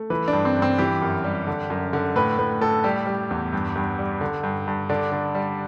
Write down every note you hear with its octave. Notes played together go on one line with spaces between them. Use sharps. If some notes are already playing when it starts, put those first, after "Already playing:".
Already playing: A3
E3 B4
D4
G2
C4
G2
C4
E3 G4
F#2
G3
D3
F#2
D3
A2 B4
A2 B4
A2 A4
G3 G4
G3
E2
G2
G2
G3
D3
G2
G2
D3 D4
D3
G3